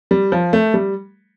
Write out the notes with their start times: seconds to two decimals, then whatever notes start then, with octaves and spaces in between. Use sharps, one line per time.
0.11 G3
0.32 F3
0.53 A3
0.74 G3